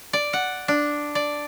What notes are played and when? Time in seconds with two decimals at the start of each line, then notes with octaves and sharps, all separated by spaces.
0.13 D5
0.33 F#5
0.68 D4
1.15 D5